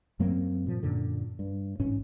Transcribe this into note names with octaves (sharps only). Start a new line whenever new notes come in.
F#2 F#3 A#3 C4
A#2 F3
F#2 A#2 D3
G2
A1 G#2 C#4